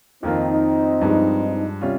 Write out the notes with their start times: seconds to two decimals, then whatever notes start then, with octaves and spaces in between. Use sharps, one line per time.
0.23 F2 D#3 A#3 C4 D#4 F4
1.01 G2 F3 G#3
1.81 C3 G3 C#4 F4